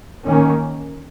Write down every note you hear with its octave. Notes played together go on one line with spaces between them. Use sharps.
D#3 A#3 C#4